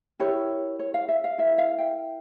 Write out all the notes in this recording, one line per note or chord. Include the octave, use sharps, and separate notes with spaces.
E4 G4 A#4 C#5
C#5
F5
E5
F5
E4 A#4 E5
F5
G5